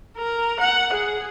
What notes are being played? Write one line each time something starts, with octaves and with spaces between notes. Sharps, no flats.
A#4
F#5
G#4